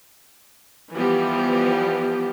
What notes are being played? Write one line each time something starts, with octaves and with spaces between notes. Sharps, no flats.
E3 F3 G3 B3 G4